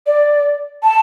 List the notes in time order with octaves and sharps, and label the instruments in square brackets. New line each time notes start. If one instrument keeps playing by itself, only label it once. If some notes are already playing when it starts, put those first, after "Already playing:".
[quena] D5
A5